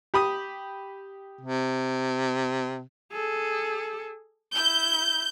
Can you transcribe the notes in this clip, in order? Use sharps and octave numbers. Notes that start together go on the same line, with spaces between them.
G4 B5 D#6
C3
G#4 A4
E4 G6